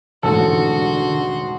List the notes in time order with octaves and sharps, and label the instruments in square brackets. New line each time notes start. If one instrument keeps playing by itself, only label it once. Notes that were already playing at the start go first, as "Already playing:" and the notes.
[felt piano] E1 A1 G#2 [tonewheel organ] D3 [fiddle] F#4 C6 [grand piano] A4